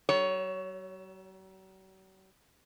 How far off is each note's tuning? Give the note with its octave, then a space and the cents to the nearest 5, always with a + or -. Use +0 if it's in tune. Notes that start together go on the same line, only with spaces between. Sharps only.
F#3 +45 C#5 +10